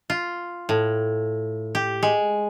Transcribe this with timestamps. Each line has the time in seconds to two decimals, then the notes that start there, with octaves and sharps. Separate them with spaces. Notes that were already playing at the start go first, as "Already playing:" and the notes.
0.10 F4
0.69 A2
1.75 G4
2.03 G#3